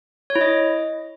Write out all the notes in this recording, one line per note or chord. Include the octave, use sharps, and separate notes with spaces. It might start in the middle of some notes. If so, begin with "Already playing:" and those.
C#5
E4
D#5